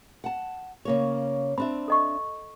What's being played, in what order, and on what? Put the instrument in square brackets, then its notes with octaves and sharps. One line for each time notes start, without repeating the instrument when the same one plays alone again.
[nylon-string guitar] F#5 A5
C#3 A#3 C#5
[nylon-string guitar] C4 D4 E5 [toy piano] B5
[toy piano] A4 D#5 C#6